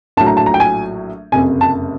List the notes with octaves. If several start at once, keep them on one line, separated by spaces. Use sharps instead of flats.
A#1 A2 F#3 A5
A#5
A5
A#5
G5
G#5
F#1 F2 C3 G#5
A5